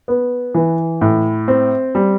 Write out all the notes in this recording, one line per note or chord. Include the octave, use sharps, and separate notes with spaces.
B3
E3
A2
C4
G3